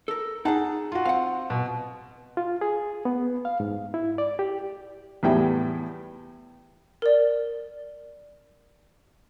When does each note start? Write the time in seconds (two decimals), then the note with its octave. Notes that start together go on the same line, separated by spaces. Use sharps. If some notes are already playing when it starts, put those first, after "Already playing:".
0.08 A4 A#4
0.45 D#4 G#4 F#5 A5
0.92 F4 F#4
1.05 C4 F5 F#5
1.50 B2
2.37 F4
2.61 G#4
3.05 B3
3.45 F5
3.60 G#2
3.94 E4
4.18 D5
4.39 G4
5.23 E2 A2 G3 G5
7.02 A#4 D5